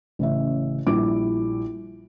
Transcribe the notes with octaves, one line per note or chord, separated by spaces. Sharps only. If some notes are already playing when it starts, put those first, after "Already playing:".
A1 C#3 E5
A#1 G3 E4 D6 D7